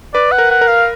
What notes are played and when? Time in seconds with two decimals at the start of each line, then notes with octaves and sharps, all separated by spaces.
0.14 B4 D5
0.32 F#5
0.38 A#4
0.50 F#5
0.61 A#4
0.67 F5